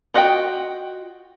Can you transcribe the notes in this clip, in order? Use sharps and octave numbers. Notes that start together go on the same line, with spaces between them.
F4 F#4 D#5 F5 G5